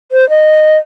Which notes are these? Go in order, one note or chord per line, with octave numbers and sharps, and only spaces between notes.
C5
D#5